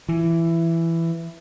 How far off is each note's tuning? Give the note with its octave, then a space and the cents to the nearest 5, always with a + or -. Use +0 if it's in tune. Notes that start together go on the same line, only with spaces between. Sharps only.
E3 +10